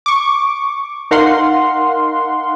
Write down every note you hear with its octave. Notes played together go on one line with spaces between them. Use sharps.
C#6 D6
D#4 A#4 F5 F#5 C6